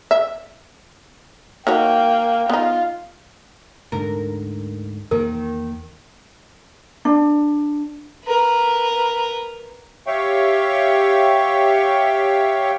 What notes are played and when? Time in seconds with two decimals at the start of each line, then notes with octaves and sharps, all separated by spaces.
0.11 E5
1.67 A#3 D#4 F#4 C#5 G5
2.49 B3 D#4 F4
3.92 D2 G#2 D3 A#4
5.11 E2 D#3 A#3 A#4
7.05 D4
8.24 A#4 B4
10.07 G4 C#5 E5 F5 G5 C#6